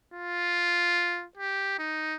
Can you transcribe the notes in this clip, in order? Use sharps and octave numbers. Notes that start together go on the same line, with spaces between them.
F4
G4
D#4